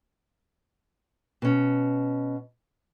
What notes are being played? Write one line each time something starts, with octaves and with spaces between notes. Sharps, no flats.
B2 C#4